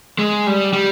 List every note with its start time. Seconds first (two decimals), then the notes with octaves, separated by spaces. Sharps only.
0.19 G#3
0.47 G3
0.73 G3